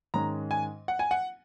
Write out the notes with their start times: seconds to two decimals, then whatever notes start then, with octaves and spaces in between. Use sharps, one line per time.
0.14 G#2 D#3 G#3 C#4 A#5
0.51 G#5
0.88 F#5
0.99 G#5
1.11 F#5